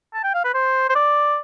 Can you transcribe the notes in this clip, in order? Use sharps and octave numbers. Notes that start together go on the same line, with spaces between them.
A5
G5
F5
B4
C5
C5
D5